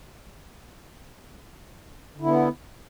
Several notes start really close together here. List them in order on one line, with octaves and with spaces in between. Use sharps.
D3 E4 B3